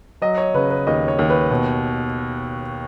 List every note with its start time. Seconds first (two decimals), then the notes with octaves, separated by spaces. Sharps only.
0.22 F#3 D#5
0.38 C#5
0.54 C#3 B4
0.71 B4
0.87 D#2 D#5
1.08 C#5
1.19 D#2
1.30 B4
1.51 B2